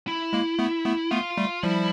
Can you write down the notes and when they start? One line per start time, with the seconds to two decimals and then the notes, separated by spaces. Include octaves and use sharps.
0.07 E4
0.33 G#3 A#3
0.59 A3 B3
0.85 A3 B3
1.11 A3 B3 F4
1.37 G3 A3
1.63 F3 G3 E4